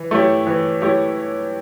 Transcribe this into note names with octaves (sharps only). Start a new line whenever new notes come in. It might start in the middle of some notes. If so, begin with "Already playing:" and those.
Already playing: E3
A3 E4 G4 C#5
E3
A3 E4 G4 C#5